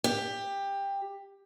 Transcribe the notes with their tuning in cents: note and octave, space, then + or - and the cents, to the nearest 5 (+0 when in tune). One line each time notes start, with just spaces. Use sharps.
G4 +15